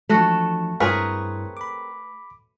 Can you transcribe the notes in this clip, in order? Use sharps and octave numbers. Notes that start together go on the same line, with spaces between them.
E3 F3 A3 D4 F#4 A4
G2 C4 E4 G#4 A#4 B4 C#5 C#6
B5 D6